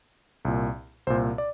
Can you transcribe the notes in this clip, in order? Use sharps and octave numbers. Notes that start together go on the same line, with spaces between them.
C2 A#2
C2 A#2 C5
D5